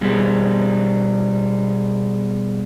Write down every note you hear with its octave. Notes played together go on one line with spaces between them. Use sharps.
B2 G3 G#3